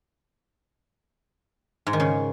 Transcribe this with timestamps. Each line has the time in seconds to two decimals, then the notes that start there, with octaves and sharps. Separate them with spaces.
1.87 G#2
1.93 D#3
2.00 C#3